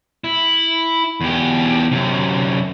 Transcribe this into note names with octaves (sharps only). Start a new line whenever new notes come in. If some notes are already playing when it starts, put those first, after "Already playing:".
E4
E2 G4
F#2 C3